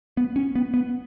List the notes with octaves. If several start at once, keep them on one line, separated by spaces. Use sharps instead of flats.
B3
C#4
B3
B3